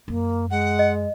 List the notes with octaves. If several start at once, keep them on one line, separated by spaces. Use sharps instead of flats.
F#2 A#3
G#3 F#5
D#5